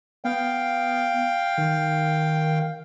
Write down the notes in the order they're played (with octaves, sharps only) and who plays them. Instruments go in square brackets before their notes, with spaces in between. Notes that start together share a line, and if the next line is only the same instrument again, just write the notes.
[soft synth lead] B3 [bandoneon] F5 G5
[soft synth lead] D#3